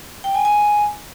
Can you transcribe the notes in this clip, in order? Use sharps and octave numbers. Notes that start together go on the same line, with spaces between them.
G5
G#5
G#5